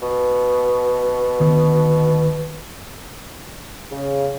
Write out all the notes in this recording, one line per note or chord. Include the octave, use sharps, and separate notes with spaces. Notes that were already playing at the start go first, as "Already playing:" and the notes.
B2
D2 D#3 B3
C#3